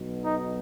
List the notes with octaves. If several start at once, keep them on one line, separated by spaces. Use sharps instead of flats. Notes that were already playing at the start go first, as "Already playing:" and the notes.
Already playing: B1 B2
D#4